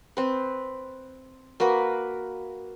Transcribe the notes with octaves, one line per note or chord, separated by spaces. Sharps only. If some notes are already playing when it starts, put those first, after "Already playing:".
C4 B4
A#3 F#4 A#4 B4